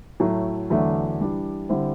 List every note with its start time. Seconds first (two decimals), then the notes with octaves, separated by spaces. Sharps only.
0.20 A2 F#3 A3
0.70 E2 D3 F#3 A3 D4
1.20 E3 G3 D4
1.69 D3 G3 C4 E4